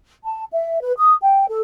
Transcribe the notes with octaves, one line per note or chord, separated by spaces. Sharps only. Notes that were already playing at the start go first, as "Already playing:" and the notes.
A5
E5
B4
D#6
G5
A4